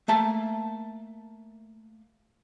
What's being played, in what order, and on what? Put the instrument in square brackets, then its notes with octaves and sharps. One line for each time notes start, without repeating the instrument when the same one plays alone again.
[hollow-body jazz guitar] A3 A#3 A5